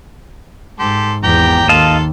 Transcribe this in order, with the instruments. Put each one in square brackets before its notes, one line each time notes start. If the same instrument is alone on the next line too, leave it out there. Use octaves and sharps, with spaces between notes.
[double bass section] G#2 [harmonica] G4 A4 C6
[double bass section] G#1 E2 [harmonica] G4 G5 A#5
[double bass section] D#2 [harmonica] F4 A4 [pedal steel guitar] D#5 F5 A5